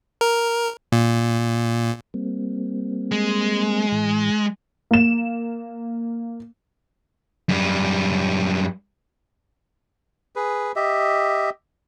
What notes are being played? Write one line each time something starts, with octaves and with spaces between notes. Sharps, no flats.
A#4
A#2
G3 A#3 C4
G#3
A2 E3
A#3 E7
F#2 G3
G#4 B4
G4 D#5 E5